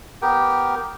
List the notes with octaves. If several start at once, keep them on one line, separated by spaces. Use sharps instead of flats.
B3 G4 A#4 G5